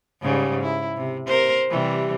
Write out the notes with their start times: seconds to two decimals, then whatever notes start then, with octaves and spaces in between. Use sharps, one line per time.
0.21 G#2 C#3 G3
0.62 E4
0.97 C3
1.27 A#4 C5
1.70 C3 E3 G3